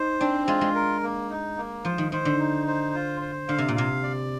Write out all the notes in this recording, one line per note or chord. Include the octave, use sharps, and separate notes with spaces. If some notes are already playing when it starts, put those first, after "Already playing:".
Already playing: D#4 C5
C4 D4
G#3 F4
G#3
A#4
A#3
D#4
A#3
F3 C5
D#3
D#3 C5
D3
D#4
C5
F4
C5
D3 F5
C3
A#2
C3 F5
D5